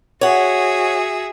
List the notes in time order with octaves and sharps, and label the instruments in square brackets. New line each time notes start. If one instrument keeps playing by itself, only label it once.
[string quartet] F#4 G#4 E5 [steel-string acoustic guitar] C#5 F#5